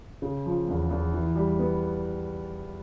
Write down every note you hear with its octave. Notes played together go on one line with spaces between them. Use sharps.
C#3
F3
E2
E2
E3
G3
B3